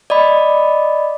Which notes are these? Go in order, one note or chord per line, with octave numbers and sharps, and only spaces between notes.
D5 D#5 B5